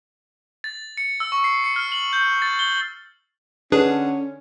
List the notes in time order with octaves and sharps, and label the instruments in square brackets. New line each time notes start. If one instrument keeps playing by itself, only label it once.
[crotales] A6
C#7
E6
C#6
C7
C#7
F6
F#7
G6
A6
G7
[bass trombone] D3 [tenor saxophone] C#4 [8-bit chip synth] D4 G#4 B4